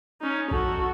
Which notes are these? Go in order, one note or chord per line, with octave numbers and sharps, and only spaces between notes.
C#4 D#4
A#1 F#4 A4